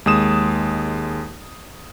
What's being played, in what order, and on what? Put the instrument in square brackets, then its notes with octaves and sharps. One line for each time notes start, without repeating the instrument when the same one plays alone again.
[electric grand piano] D#2 G#3 D#6 E7